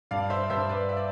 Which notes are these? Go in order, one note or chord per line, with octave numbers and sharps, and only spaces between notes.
G2 D5 F5
C5 E5
G2 C5 E5
B4 D5
E5
D5